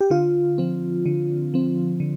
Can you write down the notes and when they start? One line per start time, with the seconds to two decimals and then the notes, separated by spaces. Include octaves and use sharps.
0.01 G4
0.10 D3 F4
0.58 F3 C4
1.06 D3
1.54 F3 C4
2.00 D3